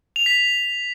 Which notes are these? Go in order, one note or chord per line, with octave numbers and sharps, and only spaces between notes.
F7
B6
F7